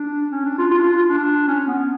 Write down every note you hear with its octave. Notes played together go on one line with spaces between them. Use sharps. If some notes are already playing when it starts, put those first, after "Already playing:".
Already playing: D4
C#4
D4
F4
F4
D4
F4
F4
D4
C#4
B3